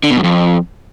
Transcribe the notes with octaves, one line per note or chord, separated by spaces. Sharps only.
D3
B2
F#2
F2